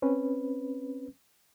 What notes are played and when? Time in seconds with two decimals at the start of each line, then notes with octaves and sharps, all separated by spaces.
0.02 C4 C#4 B4